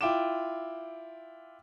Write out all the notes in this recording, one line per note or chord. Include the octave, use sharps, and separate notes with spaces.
E4 F4 G5 D6 E7